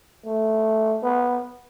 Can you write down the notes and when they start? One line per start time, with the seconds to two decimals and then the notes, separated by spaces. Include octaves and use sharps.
0.26 A3
1.03 B3